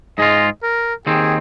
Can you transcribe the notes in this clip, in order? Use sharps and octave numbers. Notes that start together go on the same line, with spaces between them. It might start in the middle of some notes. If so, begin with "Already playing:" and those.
G#2 G#3 F4 D#5
A#4
D#2 D#3 C4 G#4